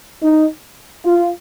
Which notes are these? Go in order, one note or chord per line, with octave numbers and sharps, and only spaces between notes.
D#4
F4